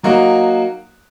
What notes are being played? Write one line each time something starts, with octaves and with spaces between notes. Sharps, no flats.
F#3 A#3 D#4 F#4